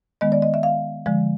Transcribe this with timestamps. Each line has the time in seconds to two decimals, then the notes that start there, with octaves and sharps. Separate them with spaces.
0.21 D#3 G#3 B3 D#5
0.32 D5
0.42 D#5
0.54 E5
0.63 F5
1.06 D3 F3 G#3